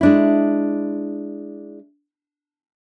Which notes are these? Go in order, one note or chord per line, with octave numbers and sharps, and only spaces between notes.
G#3 D4 E4